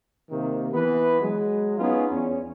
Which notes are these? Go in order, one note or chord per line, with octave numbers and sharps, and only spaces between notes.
C3 D#3 A#3
E3 B3 B4
F#3 G#3
B3 C#4 D#4 F4 G#4 B4
E2 C#4